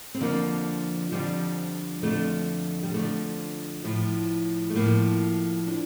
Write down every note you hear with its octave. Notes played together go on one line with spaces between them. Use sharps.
C4
F2 D3 F3 A#3
F2 D3 F3 G3
F2 D3 F3 A3
G3
F2 D3 F3 A3
A2 F3
A3
A2 F3 A#3
D4